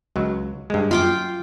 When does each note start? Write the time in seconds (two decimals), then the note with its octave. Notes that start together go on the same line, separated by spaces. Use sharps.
0.16 C#2 F#3
0.70 G2 G#3
0.91 F#2 F4 G5 D6